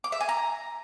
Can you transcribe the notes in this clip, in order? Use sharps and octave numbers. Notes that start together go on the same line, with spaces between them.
D6
E5
G#5
A#5